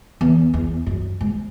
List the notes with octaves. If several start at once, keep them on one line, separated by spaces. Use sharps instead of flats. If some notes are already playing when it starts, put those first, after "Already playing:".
E2
E2
F#2
G#2